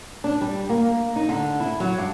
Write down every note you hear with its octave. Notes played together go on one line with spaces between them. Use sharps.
D4
G3
A#3
D#4
D3
E4
F#3
G2